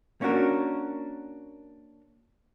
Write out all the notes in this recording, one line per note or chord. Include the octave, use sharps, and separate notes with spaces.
A#3 C#4 D4 F#4 A#4